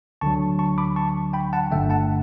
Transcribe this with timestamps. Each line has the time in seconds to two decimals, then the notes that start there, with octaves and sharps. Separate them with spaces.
0.21 D2 D3 F#3 A5 C#6
0.59 A5 C#6
0.78 B5 D6
0.96 A5 C#6
1.33 G5 B5
1.53 F#5 A5
1.71 G1 G2 D3 A3 E5 G5
1.90 F#5 A5